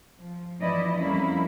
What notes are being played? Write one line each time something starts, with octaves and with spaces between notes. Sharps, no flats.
F3
E3 F3 B3 E4 D5 D#5
F2 G3 A#3 C#4 E4